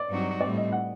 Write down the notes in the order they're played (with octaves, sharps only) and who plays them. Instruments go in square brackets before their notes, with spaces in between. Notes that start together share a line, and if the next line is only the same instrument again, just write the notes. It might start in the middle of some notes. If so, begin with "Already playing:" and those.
Already playing: [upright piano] D5
[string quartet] G2 F#3 C4 D#4 F#4
[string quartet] A2 G3 C4 [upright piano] D5
[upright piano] D#5
F#5